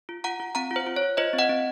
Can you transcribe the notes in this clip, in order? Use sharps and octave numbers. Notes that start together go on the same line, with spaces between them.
F4
F4 F#5 A#5
F4
C4 F#5 A#5
F4
C5
F4
C#5
F4
F4 C5 D#5
C4
D#5 F#5
C4